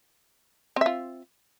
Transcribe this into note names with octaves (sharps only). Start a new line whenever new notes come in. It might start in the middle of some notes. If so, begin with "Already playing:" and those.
C4 F4 E5